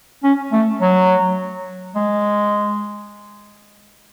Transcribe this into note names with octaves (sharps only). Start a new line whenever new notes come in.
C#4
A3
F#3
G#3